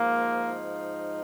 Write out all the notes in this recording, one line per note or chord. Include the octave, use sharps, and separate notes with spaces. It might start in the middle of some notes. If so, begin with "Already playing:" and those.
Already playing: G#2 F3 A#3
D#4